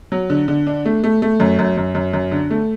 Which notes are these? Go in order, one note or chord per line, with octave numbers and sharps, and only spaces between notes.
F#3
D3
D3
D4
A3
A3
A3
F#2
F#2
F#2
F#2
F#2
D3
A3